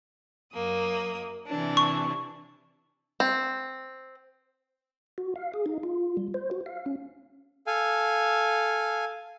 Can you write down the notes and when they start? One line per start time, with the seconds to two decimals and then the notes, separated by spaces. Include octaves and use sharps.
0.53 F#2 A#3 D#6
1.48 C3 E3 D4
1.77 C#6
3.20 C4
5.18 F#4
5.36 F5
5.54 G#4
5.66 D#4
5.83 F4
6.17 G3
6.34 C5
6.51 F#4
6.66 F5
6.86 C#4
7.67 A4 F5 G#5